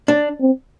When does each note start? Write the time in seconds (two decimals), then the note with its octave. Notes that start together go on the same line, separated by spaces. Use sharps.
0.08 D4
0.41 C4